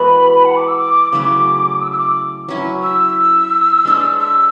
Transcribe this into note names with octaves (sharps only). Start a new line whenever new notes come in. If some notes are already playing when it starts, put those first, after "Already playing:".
Already playing: E3 G#3 B3 F#4 B5
F#5
D6
E6
D6
C#3 F#3 A3 E4 D6
E6
E6
D6
F#3 C#4 E4
E6
G#3 D4 A4 C#5
E6